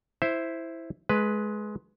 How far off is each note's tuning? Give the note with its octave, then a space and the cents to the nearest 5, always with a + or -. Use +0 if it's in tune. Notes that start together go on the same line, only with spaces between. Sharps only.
E4 +0 C5 +0 E5 +0
G#3 +20 B4 +0